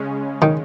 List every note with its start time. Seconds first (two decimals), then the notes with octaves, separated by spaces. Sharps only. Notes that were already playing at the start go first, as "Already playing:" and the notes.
Already playing: C#3 G#3 C#4
0.42 D#3